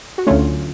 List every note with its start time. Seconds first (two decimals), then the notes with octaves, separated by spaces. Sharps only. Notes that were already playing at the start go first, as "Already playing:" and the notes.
0.18 F#4
0.27 D2 D3 F#3 A3 C#4 F4